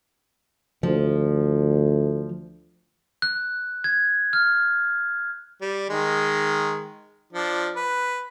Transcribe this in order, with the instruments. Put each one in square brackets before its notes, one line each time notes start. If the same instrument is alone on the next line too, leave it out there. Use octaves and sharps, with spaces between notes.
[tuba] D2 [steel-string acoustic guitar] F3
[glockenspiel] F#6
G#6
F6
[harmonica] G3
D#3 G#3
F3 D4
B4